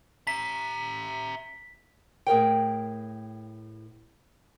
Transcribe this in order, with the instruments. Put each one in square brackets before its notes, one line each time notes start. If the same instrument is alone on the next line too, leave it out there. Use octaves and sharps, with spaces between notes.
[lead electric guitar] E5 A#5 [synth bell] B6
[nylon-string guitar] A2 G#4 A#4 G5